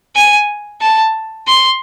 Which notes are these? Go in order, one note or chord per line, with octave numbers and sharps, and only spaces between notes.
G#5
A5
C6